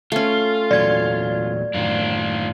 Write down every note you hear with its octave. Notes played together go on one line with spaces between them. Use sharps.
A3 C#4 F4
E2 A#2 F#3 D5 G#6
F#2 A2 D#3 D4 F4